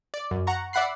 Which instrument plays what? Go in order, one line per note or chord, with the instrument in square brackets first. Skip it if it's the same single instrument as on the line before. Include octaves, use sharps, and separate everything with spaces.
[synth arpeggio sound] D5
F#2
F#5 A#5 C#6
D5 E5 F#5 B5 F#6 C7